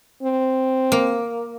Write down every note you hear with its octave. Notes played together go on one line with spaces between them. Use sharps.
C4
A#3